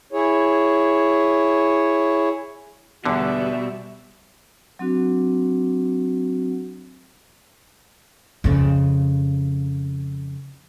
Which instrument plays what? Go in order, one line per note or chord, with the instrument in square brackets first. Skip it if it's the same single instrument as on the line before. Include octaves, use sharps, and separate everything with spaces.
[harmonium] E4 G#4 C#5
[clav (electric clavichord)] E2 D3 [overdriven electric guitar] B2 [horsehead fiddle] G3 E5
[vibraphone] F#3 C4 D4 F#4
[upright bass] F2 C#3